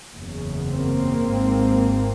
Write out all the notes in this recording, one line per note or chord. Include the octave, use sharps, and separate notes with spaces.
F#1 E2 C#3
A#3 C4
G#1 G#2